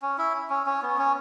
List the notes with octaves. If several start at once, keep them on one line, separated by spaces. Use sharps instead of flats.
C#4
E4
C#4
C#4
B3
C#4